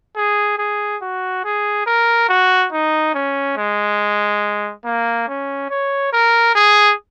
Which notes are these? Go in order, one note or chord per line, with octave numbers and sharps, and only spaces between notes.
G#4
G#4
F#4
G#4
A#4
F#4
D#4
C#4
G#3
A#3
C#4
C#5
A#4
G#4